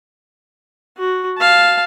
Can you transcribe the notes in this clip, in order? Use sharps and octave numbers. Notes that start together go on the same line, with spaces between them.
F#4
F5 A5